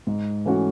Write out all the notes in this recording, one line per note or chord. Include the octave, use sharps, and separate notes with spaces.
G#2
E3 A3 C#4 F#4